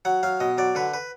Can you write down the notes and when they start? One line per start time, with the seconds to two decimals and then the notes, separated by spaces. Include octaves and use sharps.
0.05 F#3 F#5
0.23 F#3 F5
0.40 B2 D#5
0.58 F#3 D5
0.75 D3 B4
0.94 B4